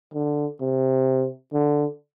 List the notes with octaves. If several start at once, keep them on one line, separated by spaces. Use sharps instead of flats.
D3
C3
D3